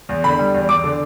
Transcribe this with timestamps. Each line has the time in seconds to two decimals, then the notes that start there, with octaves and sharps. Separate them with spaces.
0.09 E2
0.24 D3 B5
0.39 G3
0.54 E2
0.69 E2 D6
0.84 D3